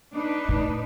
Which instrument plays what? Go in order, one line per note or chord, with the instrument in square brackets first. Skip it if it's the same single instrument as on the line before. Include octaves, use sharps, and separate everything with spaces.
[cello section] D4 D#4 B4
[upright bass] A2